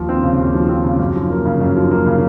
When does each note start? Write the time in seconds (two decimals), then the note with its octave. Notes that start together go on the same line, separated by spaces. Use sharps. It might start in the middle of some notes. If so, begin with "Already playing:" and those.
Already playing: D#2 F3
0.09 C4
0.23 C#3
0.39 D#2
0.54 F3
0.69 C4
0.84 C#3
0.99 F#2
1.16 F3
1.30 A#3
1.45 C#3
1.61 F#2
1.76 F3
1.91 A#3
2.06 C#3